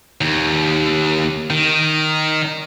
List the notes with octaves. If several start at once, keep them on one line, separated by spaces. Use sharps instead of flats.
D#2
D#3